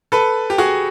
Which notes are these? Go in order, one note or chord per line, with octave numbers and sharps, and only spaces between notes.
A4 B4
G4
F#4 G#4